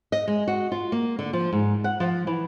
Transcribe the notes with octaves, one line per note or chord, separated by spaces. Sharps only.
D#5
G#3
F#4
F4
A#3
D3
F3
G#2
F#5
F3
E3